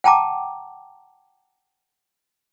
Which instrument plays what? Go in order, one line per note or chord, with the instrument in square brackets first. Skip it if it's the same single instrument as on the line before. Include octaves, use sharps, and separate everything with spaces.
[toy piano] F#5 G5 A5 A#5 D6